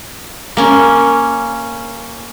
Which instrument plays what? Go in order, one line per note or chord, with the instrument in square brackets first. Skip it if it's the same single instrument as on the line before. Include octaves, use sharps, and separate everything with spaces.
[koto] A#3 C#4